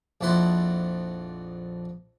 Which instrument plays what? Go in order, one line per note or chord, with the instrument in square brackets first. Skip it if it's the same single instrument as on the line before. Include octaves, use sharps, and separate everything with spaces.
[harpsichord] A#1 F2 E4 F#5 C6